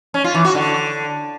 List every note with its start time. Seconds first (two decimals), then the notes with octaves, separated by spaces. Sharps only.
0.14 C#4
0.24 F4
0.34 E3
0.45 F#4
0.55 D3